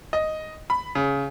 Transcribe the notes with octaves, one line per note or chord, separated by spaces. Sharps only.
D#5
B5
C#3